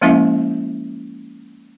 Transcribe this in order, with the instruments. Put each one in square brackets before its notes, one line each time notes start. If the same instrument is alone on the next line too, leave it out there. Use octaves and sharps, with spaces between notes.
[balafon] F3 G#3 A#3 C#4 E4 E5